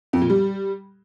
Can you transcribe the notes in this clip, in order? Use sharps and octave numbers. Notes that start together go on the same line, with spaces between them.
F2
A#2
G3